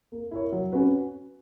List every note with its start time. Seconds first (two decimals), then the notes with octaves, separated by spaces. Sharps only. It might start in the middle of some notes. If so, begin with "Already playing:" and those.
0.12 A#3
0.31 E4 A#4 C#5
0.52 F#3
0.72 C#4 F#4 B4